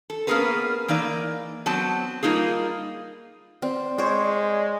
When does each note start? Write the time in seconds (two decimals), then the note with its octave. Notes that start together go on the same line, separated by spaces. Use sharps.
0.10 A4
0.27 A#3 B3 C#4 G#4 A#4 B4
0.88 E3 A#3 D#4 D5
1.66 F#3 B3 C4 A5
2.23 G3 A#3 D#4 F4 G#4
3.62 C4 D5
3.98 G#3 C5 C#5